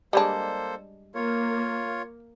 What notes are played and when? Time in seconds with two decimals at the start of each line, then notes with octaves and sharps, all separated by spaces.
0.13 G3 G#3 A#3 D4 A4 C5
1.15 A#3 F4 C#5